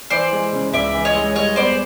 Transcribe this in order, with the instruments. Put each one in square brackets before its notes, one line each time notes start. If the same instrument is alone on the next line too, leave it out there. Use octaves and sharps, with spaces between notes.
[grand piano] E3 [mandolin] C5 D5
[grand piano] G#3
C#3
[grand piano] C#2 [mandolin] D5 E5
[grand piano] E3
[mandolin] C#5 D#5
[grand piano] G#3
[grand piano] G3 [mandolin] C#5 D#5
[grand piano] B3 [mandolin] C5 D5